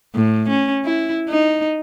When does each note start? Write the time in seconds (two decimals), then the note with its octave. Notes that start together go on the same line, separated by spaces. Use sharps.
0.15 A2
0.49 C#4
0.85 E4
1.29 D#4